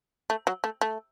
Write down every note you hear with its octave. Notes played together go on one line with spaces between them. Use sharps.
A3
F#3
A3
A3